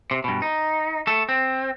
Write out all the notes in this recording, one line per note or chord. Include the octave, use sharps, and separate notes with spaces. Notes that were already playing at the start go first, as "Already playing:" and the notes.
C3
G2 B2
D#4
A3 A4
C4